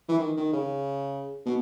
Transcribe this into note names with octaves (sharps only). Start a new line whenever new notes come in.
E3
D#3
D#3
C#3
B2